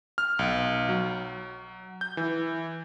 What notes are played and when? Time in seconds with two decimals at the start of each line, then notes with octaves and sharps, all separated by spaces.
0.18 F6
0.39 B1
0.89 F#3
2.01 G6
2.17 E3